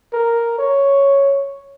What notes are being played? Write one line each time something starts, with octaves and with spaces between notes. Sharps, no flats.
A#4
C#5